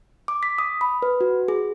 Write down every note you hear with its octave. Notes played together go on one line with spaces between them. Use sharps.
D6
B6
D#6
B5
B4
F#4
G#4